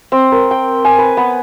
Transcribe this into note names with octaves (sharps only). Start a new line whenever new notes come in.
C4
A#4
G5
G#5
B4
B3